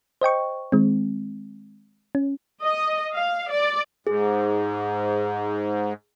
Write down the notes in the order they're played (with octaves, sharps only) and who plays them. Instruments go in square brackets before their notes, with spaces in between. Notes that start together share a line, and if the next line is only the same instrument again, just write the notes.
[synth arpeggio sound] C5 D#5 G5 C#6
D#3 G#3 C4
C#4
[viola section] D#5
F5
D5
[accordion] G#2 [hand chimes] G#4